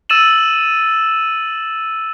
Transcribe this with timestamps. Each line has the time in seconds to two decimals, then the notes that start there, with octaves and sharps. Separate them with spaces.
0.09 E6 A6 D#7 E7 F#7